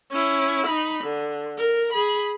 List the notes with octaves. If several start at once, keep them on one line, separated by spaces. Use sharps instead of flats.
C#4 E4
D#4 B5
D3
A#4
G#4 B5